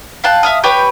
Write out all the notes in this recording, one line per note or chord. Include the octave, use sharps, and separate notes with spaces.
F5 G5 A5 F#6
E5 F5 D#6
G4 B4 C#5 G5